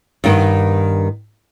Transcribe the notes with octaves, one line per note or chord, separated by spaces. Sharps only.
G2 D#3 B3